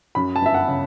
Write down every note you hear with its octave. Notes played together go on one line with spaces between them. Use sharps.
F#2 B5
A5
G1 E5
F#5
C#3